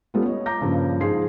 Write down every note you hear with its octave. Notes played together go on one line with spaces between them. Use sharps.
G3 A3 B3 C#4 F4
C#5 D#5
A#5 D6 G6 A#6
G2 A#2 C#3 F3
G#2 F3 G#4 C6 C7